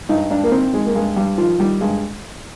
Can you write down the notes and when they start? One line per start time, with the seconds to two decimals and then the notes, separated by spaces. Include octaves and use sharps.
0.09 G2 D#4
0.30 G2 D4
0.43 A#3
0.52 D#3 C4
0.73 D#3 G#3
0.86 A#3
0.95 G2 G#3
1.16 G2 G3
1.38 D#3 F3
1.59 D#3 G3
1.81 G2 G#3